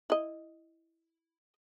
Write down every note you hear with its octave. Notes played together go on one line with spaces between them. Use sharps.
E4 D#5